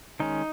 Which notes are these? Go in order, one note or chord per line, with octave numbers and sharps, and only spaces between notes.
D#3 G#3 C#4 D#4